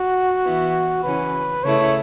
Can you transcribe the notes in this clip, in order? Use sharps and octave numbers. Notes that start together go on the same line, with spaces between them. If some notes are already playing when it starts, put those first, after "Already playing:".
Already playing: F#4
E3 B3 E4
C#3 E3 C#4 B4
C#3 A3 E4 C#5